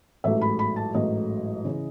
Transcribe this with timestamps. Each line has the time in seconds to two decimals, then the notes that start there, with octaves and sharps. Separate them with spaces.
0.24 A1 G#2 F#3 A3 E5
0.41 B5
0.59 B5
0.76 A5
0.94 A1 G#2 F#3 A3 D#5
1.64 C#3 E3